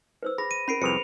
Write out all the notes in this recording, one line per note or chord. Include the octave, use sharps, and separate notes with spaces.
B4 C5 E6
G#4 B5 A#6
D#7
C#4 A#4 B5 C7 D7
C2 F2 G#4 B4 C5 C#7 F7